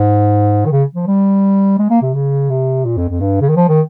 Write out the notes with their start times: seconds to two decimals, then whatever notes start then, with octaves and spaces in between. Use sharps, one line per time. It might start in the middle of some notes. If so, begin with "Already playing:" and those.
Already playing: G#2
0.66 D#3
0.72 C#3
0.95 F3
1.07 G3
1.79 G#3
1.90 A#3
2.02 C3
2.14 C#3
2.50 C3
2.85 A#2
2.97 F2
3.09 F2
3.20 G2
3.41 C#3
3.49 D#3
3.56 F3
3.68 D#3